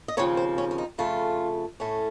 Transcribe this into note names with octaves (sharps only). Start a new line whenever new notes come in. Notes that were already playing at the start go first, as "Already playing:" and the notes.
D#5
D#2 C#3 F3 C4 C#5
C5
C#4
C#4
D#4
F2 C#3 A3 F4
A2 A3 C#4